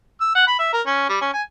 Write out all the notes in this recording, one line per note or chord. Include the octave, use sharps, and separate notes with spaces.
E6
F#5
B5
E5
A#4
C#4
G3
C#4
G#5